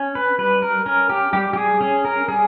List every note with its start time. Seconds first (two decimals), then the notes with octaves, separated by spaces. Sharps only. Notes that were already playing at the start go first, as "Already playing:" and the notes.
Already playing: C#4
0.15 B4
0.38 G3 B4
0.62 A#4
0.86 C#4 A#4
1.10 G4
1.33 G3 G4
1.53 G4
1.57 G#4
1.81 C#4 G#4
2.05 A#4
2.28 G3 G#4